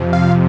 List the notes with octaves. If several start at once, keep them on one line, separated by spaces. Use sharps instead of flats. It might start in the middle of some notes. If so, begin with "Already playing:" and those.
Already playing: F2 C3 F3
F5